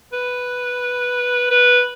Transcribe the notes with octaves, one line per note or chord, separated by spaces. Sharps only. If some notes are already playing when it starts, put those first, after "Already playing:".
B4
B4